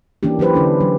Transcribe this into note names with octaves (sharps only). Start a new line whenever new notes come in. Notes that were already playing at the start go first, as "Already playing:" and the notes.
E3 A#3 C#4 D4 G4
E3 F#3 G4 B4 C5
D3 C#4 D4 A4
F#3